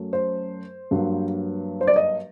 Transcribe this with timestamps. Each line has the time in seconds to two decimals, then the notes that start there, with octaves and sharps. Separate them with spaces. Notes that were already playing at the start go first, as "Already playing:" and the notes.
Already playing: F#2 F#3 A3
0.13 C5
0.91 G2 F#3 A#3
1.81 C5
1.87 D5
1.96 D#5